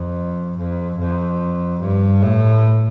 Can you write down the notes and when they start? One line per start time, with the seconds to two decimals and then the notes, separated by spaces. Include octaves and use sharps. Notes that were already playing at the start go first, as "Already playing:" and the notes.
Already playing: F2
0.58 F2
0.99 F2
1.81 G2
2.23 A2